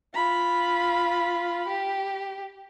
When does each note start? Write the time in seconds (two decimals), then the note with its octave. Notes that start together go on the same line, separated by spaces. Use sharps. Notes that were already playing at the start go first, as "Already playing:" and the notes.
0.14 F4 B5
1.67 G4